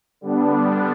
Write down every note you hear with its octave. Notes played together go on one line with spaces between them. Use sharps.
D3 G3 B3 D4